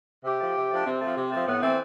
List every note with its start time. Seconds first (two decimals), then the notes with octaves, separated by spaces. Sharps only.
0.24 C3 G4
0.41 F3 A3
0.55 C3
0.71 F3 A3 D4
0.85 C3 C4
1.01 F3 A3
1.16 C3
1.32 F3 A3
1.47 A2 B3
1.62 E3 A3 C4